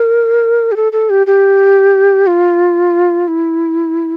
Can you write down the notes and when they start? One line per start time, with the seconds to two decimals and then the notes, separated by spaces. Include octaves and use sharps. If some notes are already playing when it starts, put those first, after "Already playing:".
Already playing: A#4
0.72 G4
0.76 A4
0.92 A4
1.10 G4
1.27 G4
2.27 F4
3.28 E4